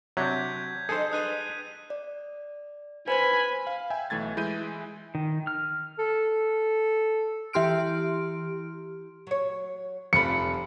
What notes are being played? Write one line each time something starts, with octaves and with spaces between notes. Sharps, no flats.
C3 F#3 D4 G6 G#6 B6
F3 D4 G#4 A4 C5
G3 D4 B4 D#6 F#6 D#7
D5
B4 C5 G#5 B5 G#6
F5
E5 G5 G#5
B1 E3 A3 G#6 A6
E3 G#3 E4 G6 D#7
D#3
F6
A4
E3 E4 G4 C6 F6 D7
F#3 C#5
F1 D3 C4 F4 B5 C#7